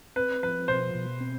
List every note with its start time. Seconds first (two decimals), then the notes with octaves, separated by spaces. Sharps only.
0.16 C4 B4
0.43 F3 B4
0.68 B2 C5
0.95 B2
1.20 C4